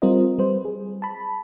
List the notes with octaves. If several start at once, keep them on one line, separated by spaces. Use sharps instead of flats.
G3 C4 F4 A#4 C5 D#5
G3 B4 C5
G#4
A5 B5